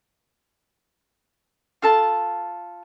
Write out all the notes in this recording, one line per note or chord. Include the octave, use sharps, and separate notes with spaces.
F4 A4 A5